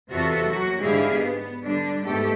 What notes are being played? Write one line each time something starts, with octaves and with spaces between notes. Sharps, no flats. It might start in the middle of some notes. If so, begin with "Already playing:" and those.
E2 C3 F4 F#4 A4 E5
F#3 A#3 F#4
G#2 D3 E4 G4 G#4 F5
B3
D3 G3 D4
G#2 A3 B3 G4 A4